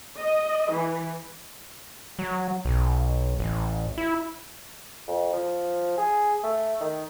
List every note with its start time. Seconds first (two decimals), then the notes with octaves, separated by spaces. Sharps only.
0.18 D#5
0.71 E3
2.19 F#3
2.65 B1
3.40 A1
3.98 E4
5.08 F2
5.33 F3
5.98 G#4
6.44 A3
6.81 D#3